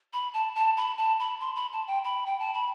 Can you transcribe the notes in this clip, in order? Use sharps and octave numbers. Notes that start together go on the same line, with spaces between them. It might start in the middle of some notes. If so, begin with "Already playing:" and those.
B5
A5
A5
B5
A5
B5
C6
B5
A5
G5
B5
G5
A5
B5